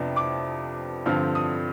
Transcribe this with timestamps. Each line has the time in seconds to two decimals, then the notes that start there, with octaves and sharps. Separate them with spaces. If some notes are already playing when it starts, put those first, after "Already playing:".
Already playing: F2 C3 F3 B3 D4
0.16 D6
1.06 G2 D3 F3 C4 F6
1.35 D#6